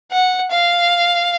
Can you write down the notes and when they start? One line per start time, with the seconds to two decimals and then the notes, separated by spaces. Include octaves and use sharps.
0.12 F#5
0.52 F5